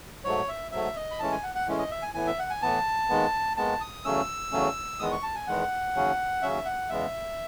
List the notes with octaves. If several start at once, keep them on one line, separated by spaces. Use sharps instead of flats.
G#2 F#3 A3 C#5
E5
G#2 F#3 A3 E5
D#5
B5
A2 E3 G#3 C#4 A5
G#5
F#5
F#5
A2 E3 G#3 C#4
D#5
E5
G#5
A2 E3 B3 G#5
E5
F#5
G#5
A2 E3 B3 A5
D#2 D#3 G#3 B3
D#2 D#3 G#3 B3 A5
D#6
E2 C#3 F#3 A3 C#4 E6
E2 C#3 F#3 A3 C#4
E2 D#3 G#3 B3 D#6
C#6
A5
G#5
E2 D#3 G#3 B3 F#5
D#2 C#3 F#3 C#4
D#2 C#3 F#3 C#4 E5
F#5
E2 C#3 G#3 B3 E5